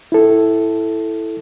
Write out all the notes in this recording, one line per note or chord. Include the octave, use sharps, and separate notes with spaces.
E4 A4